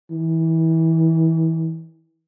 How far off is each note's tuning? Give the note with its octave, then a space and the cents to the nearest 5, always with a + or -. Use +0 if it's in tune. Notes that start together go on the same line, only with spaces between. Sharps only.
E3 -25